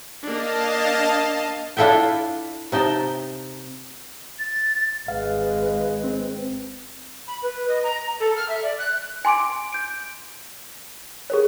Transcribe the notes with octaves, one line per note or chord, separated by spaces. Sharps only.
A#3 D4 D#5 F5 A5
D4 E4 F4 A4 E5 G5
C3 D#4 G5 A5
A6
G#1 G#3 B4 F5
C4
B5
B4
D#5
A#5
A4
F6
E5
D5
F#6
G#5 C6 D6 D7
G6 D7
G#4 A#4 C#5